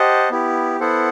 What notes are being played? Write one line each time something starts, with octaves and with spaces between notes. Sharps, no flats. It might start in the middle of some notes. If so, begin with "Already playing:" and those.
Already playing: G4 C5 D#5 F#5 A5
B3 E4 G4
B3 E4 A4 C5 F#5